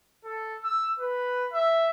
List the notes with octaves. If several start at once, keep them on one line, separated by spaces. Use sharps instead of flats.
A4
E6
B4
E5